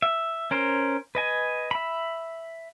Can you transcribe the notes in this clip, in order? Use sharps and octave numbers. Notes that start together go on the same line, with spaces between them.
E5
C#4 A#4 C5
B4 D#5 G#5
E5 B5